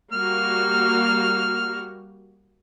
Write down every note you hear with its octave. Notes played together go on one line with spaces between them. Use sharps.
G3 A#3 F#4 F6